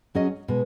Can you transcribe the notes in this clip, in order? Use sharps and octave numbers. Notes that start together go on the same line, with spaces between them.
F#3 C#4 G#4 D#5
B2 G#3